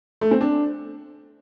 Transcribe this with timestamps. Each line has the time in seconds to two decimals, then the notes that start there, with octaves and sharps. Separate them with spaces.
0.21 A3
0.31 C4
0.41 D4